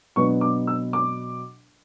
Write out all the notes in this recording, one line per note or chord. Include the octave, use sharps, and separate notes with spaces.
B2 F#3 B3 D4 C#6
D6
E6
D6